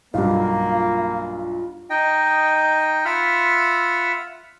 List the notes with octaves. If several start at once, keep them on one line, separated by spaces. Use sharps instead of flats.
B1 G2 A#3 F4 F5
D#4 D#5 G5
F4 E5 F#5 B5 F6